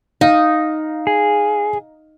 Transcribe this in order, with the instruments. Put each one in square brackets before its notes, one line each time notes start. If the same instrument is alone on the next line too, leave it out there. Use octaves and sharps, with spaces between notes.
[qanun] D#4 [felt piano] F5
[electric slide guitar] G#4